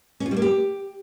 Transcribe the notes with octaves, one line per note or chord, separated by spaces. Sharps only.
C#4
F4
G3
A#3
G4